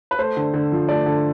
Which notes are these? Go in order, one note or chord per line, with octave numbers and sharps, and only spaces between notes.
B4
A3 C5
D3
D3
F3
A3 D5
D3